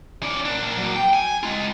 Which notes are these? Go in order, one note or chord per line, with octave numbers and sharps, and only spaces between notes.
C#4 D5
A#2 D4
F#3 A#3
G5
G#5
G#3 F4